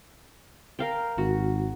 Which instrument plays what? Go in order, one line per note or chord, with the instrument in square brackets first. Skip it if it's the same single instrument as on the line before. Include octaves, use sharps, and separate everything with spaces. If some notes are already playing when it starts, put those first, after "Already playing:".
[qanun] A#4 F5 G5
[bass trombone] G#1 [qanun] F#4